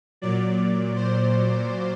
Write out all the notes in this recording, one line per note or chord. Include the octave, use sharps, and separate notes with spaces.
A#2 F#3 D5
C5